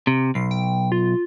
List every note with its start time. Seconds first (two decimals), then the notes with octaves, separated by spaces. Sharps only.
0.07 C3
0.35 B1 C7
0.51 G5
0.92 F4